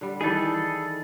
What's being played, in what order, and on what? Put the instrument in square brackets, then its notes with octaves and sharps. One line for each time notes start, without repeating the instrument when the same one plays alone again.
[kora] D3 G3
[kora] D#3 E3 G3 [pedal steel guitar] G#4 A4